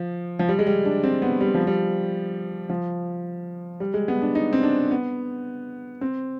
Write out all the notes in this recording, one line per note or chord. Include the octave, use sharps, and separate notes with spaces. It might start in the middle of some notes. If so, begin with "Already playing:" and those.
Already playing: F3
F3
G3
G#3
G3
D4
C4
B3
G3
F3
G3
F3
G3
G#3
B3
D4
D#4
C4
D4
B3
C4